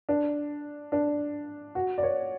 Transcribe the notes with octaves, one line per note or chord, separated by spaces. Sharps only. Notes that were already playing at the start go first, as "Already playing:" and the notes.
D4
D4
F#4
D5
C#5